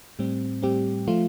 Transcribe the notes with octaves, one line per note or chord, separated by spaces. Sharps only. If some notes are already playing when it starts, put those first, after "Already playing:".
A2 G3 C4
A2 G3 C4 G4
F3 A3 F4